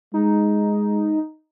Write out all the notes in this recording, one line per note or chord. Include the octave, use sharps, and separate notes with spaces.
G#3 D#4